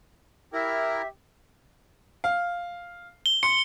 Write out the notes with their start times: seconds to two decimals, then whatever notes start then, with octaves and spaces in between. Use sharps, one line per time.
0.54 E4 G4 A#4 E5
2.24 F5
3.26 G7
3.43 C6 C#7